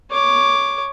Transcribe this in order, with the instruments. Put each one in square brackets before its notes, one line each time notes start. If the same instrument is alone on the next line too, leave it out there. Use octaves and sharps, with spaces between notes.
[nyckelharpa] C#5 D6